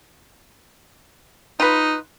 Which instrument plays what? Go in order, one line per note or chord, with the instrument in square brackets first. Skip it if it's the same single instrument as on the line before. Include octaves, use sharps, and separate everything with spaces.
[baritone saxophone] D#4 [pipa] F4 B4